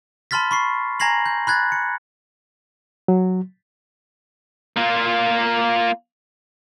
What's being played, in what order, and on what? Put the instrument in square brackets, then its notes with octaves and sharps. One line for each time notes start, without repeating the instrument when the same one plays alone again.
[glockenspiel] A5 B5 C6 F6 A6 B6
B5 C#6 C7
G#5 A#5 G#6 A#6 C7 F#7
G6
B5 F#6 G#6 A6
C#7
[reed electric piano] F#3
[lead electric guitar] A#3 F4